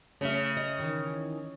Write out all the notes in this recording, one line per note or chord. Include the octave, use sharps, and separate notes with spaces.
C#3 A3 D#5 E5
D#5
D#3 E3 D#4